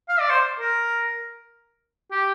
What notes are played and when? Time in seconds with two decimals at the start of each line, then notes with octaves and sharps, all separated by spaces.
0.09 F5
0.20 D5
0.30 C5
0.59 A#4
2.11 G4